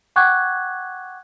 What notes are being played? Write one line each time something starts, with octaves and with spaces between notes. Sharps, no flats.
F#5 G5 C#6 D6 F#6 G#6